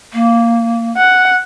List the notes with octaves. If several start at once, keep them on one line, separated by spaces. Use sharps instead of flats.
A#3
F#5